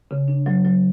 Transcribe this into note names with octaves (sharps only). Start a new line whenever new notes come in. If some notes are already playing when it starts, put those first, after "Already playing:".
C#3
D4
F#3
F#3